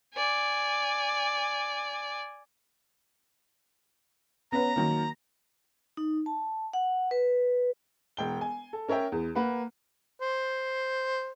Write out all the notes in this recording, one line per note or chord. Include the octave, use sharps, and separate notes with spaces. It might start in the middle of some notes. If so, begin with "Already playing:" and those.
D5 G#5
B3 C#4 B4 A#5
D#3 F#3 A#3
D#4
A5
F#5
B4
E1 G5 G7
G#5
A4
C#4 A#4 C#5 E5 G5
E2
A#3 B4 F#5
C5